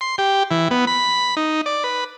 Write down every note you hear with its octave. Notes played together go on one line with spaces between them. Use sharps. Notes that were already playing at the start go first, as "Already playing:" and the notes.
C6
G4
E3
B3
B5
D#4
D5
B4